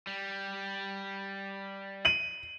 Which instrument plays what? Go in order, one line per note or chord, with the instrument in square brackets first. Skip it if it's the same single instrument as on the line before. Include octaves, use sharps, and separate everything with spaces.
[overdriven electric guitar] G3
[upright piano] D#7 F#7